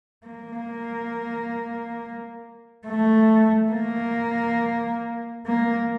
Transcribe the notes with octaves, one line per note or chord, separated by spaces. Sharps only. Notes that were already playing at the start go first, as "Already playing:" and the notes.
A#3
A3
A#3
A#3